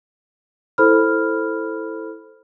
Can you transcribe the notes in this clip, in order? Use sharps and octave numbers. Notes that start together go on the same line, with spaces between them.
E4 A4 C5 B5 F6